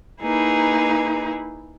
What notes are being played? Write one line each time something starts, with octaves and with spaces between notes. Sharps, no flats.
A#3 D#4 E4 G#4 B4